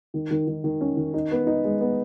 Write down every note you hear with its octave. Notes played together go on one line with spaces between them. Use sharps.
D#3
D#3
D#3
D#3
C#4
D#3
D#4
B3
D#4
G#3
B3